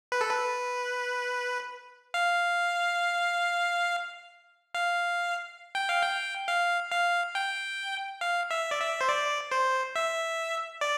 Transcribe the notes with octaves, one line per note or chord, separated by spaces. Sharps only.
B4
A4
B4
F5
F5
G5
F5
G5
F5
F5
G5
F5
E5
D5
E5
C5
D5
C5
E5
D5